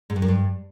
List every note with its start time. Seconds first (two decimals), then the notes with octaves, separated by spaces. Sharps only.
0.10 G#2
0.16 G2
0.22 F#2
0.28 G2